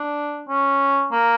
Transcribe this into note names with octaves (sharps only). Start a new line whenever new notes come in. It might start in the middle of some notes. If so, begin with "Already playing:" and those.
Already playing: D4
C#4
A#3